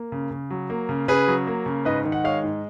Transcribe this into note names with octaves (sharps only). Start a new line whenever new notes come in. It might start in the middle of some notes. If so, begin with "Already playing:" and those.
Already playing: A#3
C#3
C#3
F#3
A#3
C#3
C#3 G#4 B4
F#3
A#3
C#3
G#2 B4 D#5
D#3
F#5
G#3 C#5 F5
G#2